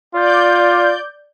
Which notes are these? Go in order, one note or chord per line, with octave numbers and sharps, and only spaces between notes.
F4 D5 G6